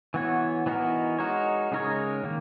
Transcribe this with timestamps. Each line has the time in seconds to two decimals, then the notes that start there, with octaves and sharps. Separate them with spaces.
0.14 E3 B3 F#4 C#5
0.66 E3 B3 D#4 F#4 A#4
1.19 G#3 D#4 F#4 A#4 C#5
1.72 C#3 G#3 D#4 A#4 C#5
2.24 D#3 A#3